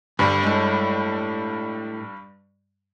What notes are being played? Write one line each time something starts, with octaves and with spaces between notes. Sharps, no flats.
D2 G2 G3 B5
A2 G#3